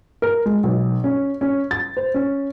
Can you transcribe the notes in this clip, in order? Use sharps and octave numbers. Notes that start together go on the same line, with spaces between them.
A#4
G#3
B1
C#4
C#4
A6
C5
C#4